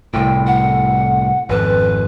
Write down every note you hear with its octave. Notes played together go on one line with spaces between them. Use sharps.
C2 A2 G5
F#5
G#1 F2 B4